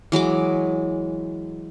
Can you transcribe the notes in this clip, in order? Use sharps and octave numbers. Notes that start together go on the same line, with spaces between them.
E3 F#3 G#3 D6